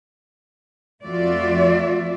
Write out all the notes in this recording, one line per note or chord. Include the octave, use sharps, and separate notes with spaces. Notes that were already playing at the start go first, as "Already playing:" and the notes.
F2 A3 F4 F#4 D5 E5